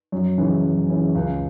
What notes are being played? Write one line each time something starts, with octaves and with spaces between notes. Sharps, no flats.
F#2
C#3 E3
F#2
C#3 E3
C#2